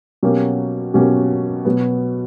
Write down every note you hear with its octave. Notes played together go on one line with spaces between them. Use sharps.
B2 F#3 A#3 C#4 G4
B2 F#3 A#3 C#4 G4
B2 F#3 B3